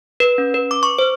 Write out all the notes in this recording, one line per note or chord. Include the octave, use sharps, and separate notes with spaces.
B4
C#4
B4
D6
C#6
C5